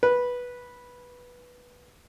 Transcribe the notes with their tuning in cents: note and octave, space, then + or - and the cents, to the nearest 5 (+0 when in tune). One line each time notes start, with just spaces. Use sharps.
B4 -10